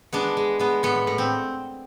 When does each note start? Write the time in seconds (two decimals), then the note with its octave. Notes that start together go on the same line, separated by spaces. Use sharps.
0.13 G#3 B3 D4
0.37 G#3
0.59 G#3 B3
0.83 A2 B3
1.07 A2
1.18 C4